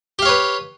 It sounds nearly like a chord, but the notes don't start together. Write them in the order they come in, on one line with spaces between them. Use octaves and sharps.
G4 F5 C#5 B4